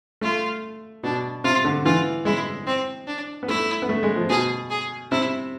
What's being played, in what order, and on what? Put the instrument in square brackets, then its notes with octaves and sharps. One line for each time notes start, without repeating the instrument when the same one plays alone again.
[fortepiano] A3 [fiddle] F4
[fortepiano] B2 [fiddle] D4
[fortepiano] C3 [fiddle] F4
[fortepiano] D3
[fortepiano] E3 [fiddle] F4
[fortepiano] G#3 [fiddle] E4
[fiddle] C4
D4
[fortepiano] B3
[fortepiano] A3 [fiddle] E4
[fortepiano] B3
A3
G#3
F3
[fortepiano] B2 [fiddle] G#4
[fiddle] G#4
[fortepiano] C3 [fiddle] E4